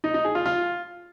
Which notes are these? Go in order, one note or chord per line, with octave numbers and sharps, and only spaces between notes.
D#4
D#4
G#4
F4
F4